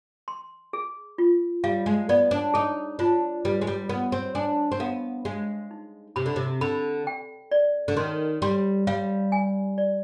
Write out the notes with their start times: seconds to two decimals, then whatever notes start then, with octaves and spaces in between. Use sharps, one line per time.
0.28 C6
0.73 G#4
1.18 F4
1.64 G3 F5
1.86 G#3
2.09 B3 D5
2.31 D4
2.54 D#4 G#4
2.99 D4 F4
3.45 G3 B4
3.61 G#3
3.67 G3
3.89 B3 B4
4.12 C4
4.35 D4 G#5
4.72 C4
4.80 B3 F5
5.25 G#3 F5
5.71 D#4
6.16 C3 B5
6.26 D3
6.36 C3
6.61 D3 B5
7.07 G5
7.51 D5
7.88 D3
7.97 D#3 C6
8.42 G3 C6
8.87 G3 F5
9.32 G#5
9.78 D5